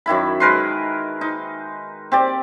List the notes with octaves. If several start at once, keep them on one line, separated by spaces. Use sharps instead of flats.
F#2 D#3 E4 B5
G#3 A#4 B4 C6
D#4
C4 G4 D5